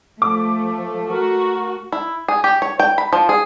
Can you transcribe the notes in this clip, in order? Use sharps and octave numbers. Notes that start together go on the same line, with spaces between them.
F3 A3 D6
F#4 A#4
E4
G#4
G4
C#5
G5
B5
F3
G#4